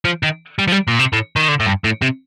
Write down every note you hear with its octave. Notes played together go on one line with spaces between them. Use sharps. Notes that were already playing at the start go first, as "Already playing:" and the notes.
F3
D#3
G3
F3
G3
A#2
C3
A2
D#3
D3
A2
G2
A2
C3